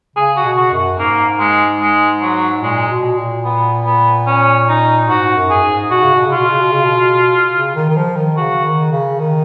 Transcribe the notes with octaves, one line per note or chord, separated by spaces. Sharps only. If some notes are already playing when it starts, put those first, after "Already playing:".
C#3 G#4
F#4
B2
F#4
F#2
G#2 A#3
G#3
G#3
F#3
A#2 G#3
B2
A#2
B3
B3
C#4
D#4
G#2 F#4
F#2
G#4
G#2
B2 F#4
C#3
B2
C#3
F4
B2
C#3
B2
C#3
B2
C#3
D#3
D#3
F3
D#3
C#3 F#4
D#3
C#3
D#3